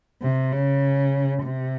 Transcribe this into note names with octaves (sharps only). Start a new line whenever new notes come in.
C3
C#3
C3